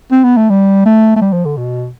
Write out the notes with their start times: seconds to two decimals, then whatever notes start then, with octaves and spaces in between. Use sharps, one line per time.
0.11 C4
0.24 B3
0.37 A3
0.50 G3
0.86 A3
1.16 A3
1.21 G3
1.33 F3
1.45 D3
1.57 B2